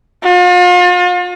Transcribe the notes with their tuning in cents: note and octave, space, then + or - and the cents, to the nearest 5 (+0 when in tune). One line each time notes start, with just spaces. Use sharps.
F4 +40